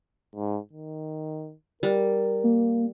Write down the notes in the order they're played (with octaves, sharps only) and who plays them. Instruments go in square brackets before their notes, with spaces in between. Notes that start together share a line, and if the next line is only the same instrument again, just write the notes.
[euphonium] G#2
D#3
[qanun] G3 [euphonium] A#4
[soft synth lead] A#3